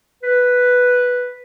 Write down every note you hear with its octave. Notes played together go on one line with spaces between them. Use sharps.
B4